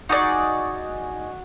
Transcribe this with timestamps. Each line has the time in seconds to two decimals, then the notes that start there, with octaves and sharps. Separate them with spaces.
0.09 D#4 F#4 G#4 D5